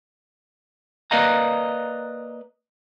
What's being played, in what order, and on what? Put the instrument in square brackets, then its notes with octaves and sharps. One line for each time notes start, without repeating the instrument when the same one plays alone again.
[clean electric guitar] A#3 B4 D5 D#5 F5 A#5